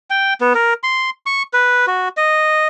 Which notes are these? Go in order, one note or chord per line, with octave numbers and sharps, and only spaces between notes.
G5
B3
A#4
C6
C#6
B4
F#4
D#5